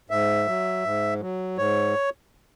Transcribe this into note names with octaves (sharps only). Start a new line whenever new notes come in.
G#2 E5
F#3
G#2
F#3
G#2 C#5